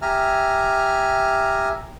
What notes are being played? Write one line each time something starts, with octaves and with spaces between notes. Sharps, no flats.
G4 E5 G#5 A#5 F6